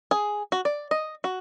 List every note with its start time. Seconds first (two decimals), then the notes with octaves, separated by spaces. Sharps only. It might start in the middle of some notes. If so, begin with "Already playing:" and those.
0.11 G#4
0.52 F#4
0.65 D5
0.91 D#5
1.24 F#4